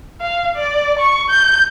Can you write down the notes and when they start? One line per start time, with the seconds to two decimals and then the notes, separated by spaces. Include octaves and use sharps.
0.20 F5
0.56 D5
0.99 C#6
1.30 G6